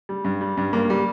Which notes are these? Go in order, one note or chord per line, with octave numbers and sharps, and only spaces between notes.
G3
G2
G3
G2
G2 A#3
G3